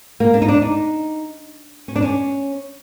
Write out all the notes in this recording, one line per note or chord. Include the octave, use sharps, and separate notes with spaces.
A#3
D4
D#4
D4
D#4
C#4
D4
C#4